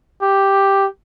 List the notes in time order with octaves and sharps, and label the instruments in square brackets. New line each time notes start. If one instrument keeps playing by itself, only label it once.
[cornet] G4